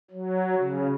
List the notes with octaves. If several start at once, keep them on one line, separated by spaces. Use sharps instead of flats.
F#3
C#3